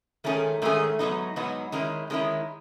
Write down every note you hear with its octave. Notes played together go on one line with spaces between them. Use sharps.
G#2 D#3 A3 C#4 G#4
G#2 D#3 A3 C#4 G#4
G#2 F#3 B3 D#4
G#2 F#3 B3 D#4
D#3 G#3 C#4 E4
D#3 G#3 C#4 E4